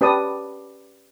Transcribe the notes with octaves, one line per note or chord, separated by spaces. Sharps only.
C#4 G4 B4 D5 A5 D#6